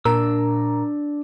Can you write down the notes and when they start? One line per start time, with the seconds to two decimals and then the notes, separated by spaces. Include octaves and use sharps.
0.05 A#2 D4 A#4 A#5 E6